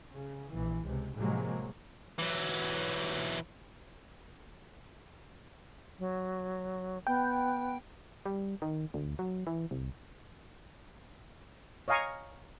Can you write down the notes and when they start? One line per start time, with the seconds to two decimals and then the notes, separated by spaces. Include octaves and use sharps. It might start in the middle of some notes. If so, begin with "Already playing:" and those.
0.14 C#3
0.54 A#1 E3
0.87 C#2 C3
1.16 A2 C3 F3 F#3 G#3 A#3
2.19 E3 F#3
5.99 F#3
7.07 B3 G5
8.26 G3
8.62 D#3
8.94 D2
9.19 F#3
9.47 E3
9.71 C2
11.88 C#5 D#5 F5 G#5 A#5 C#6